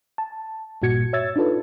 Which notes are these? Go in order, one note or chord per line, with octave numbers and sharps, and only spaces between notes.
A5
G#1 G2 A#2 F#4 G#6 C#7
C#5 E5 E6 G#6 A6
D4 D#4 F4 A4 B4